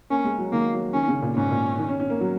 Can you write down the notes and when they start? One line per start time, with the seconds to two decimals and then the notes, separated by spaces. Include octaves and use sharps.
0.10 A#3 C#4
0.24 G#3
0.38 F#3
0.53 D#3 A#3
0.74 F#3
0.94 D#3 C#4
1.08 C#3
1.22 A#2
1.36 G#2 C#4
1.50 A#2
1.79 D#3
1.89 C#4
2.00 C#4
2.10 A#3
2.20 F#3